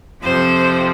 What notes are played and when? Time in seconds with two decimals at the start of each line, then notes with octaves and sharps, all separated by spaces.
0.22 F2 C3 F3 C5